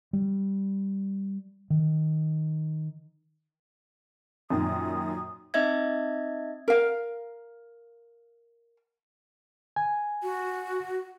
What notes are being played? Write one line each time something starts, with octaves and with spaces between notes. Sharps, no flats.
G3
D#3
F#2 A#2 D#3 D#6
C4 D#4 D#5 E5 G#6
A#4 F5
G#5
F#4